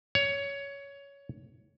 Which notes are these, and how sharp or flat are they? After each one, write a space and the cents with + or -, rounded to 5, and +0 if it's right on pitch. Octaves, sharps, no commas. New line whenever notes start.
C#5 +15